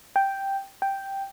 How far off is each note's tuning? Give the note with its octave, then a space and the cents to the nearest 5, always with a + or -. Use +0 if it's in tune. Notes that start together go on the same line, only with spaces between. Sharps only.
G5 +0
G5 +0